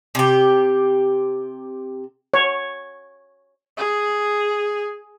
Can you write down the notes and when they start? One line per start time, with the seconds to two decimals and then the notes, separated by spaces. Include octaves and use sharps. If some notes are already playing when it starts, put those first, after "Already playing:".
0.15 C3 G4
2.34 C#5
3.77 G#4